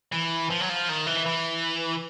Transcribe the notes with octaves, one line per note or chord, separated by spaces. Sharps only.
E3
F3
F#3
F3
D#3
E3
E3